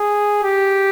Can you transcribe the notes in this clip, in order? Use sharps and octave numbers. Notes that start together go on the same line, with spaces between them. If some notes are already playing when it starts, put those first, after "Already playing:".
Already playing: G#4
G4